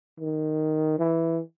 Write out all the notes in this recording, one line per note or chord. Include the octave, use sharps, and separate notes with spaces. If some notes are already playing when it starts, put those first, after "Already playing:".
D#3
E3